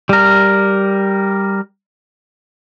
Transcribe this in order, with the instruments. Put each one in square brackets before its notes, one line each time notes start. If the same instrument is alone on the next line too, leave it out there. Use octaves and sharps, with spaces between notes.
[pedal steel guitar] G3 A#4